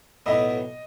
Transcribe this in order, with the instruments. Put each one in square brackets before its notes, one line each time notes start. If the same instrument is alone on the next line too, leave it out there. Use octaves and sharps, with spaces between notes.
[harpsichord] B1 A2 F#3 B3 E4 [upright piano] D#5